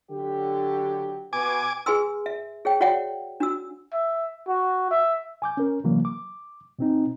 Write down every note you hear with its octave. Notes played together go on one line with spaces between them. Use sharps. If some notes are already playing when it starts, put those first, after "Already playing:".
D3 F#3 G4
B2 G#5 D6
G#4 B4 G#5 C6 E6
E5
G#4 C#5 G5
F#4 C#5 D5 E5 F#5 G5
D4 F#4 E6
E5
F#4
E5
G#5 D6 G6
C#4 A#4
C3 E3 F#3 A#3
D6
B2 C4 D#4